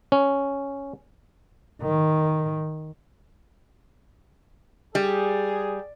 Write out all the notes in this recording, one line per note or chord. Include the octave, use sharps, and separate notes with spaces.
C#4
D#3
G3 G#4